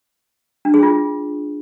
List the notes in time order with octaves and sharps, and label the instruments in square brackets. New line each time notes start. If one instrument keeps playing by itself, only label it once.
[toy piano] D4
G#4
F4